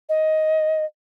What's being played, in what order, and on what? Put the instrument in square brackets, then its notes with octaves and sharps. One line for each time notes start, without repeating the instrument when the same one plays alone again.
[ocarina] D#5